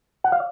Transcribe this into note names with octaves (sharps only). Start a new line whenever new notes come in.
F#5
F5